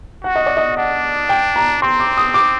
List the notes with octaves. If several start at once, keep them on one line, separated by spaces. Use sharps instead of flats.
F#4 F#5
D#5
D5
D#5
D4 F#5
G5
A#5
C4 C6
D6
D#6
D6